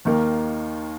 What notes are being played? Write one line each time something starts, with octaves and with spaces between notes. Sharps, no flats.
D#2 D#3 A#3 D#4 A#4